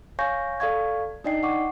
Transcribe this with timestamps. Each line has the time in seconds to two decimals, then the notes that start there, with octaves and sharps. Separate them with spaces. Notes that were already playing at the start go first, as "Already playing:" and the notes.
0.19 C#5 F5 G#5 C#6 G6 A#6
0.60 A4 D5 F5 C#6 G#6
1.24 D4 D#4 D5 D#5 G5 C7
1.43 F#5 C#6 D6